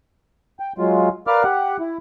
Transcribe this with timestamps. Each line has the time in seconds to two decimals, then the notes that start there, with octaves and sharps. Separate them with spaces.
0.60 G5
0.78 F#3 G#3 F4
1.27 A#4 B4 D5 F5 D6 F6
1.44 G4 F#5
1.80 E4